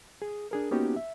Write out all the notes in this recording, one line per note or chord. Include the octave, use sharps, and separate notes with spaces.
G#4
D4 G#4 A#4
A#3 B3 C#4 D#4 F#4 G4
E5